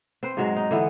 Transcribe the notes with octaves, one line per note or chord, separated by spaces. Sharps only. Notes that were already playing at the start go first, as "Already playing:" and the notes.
C4 B4 C5
G#2 F#3 G#3
D#4
D3 E3 B3